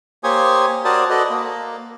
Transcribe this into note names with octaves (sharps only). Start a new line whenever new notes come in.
A#3 G4 C5 C#5 G#5 D#6
F#4 A#4 C5 D5 A5 D#6
F#4 A4 B4 D5 D#5
A#3